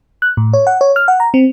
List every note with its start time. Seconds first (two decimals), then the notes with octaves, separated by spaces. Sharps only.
0.22 F#6
0.37 A2
0.53 C#5
0.67 F#5
0.81 C#5
0.96 F6
1.08 F#5
1.20 A#5
1.34 C4